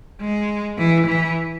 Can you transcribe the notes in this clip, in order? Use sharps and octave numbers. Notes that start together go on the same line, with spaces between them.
G#3
E3
E3